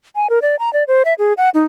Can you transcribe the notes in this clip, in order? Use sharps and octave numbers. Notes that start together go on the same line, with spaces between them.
G#5
A#4
D5
A#5
D5
C5
E5
G#4
F#5
D#4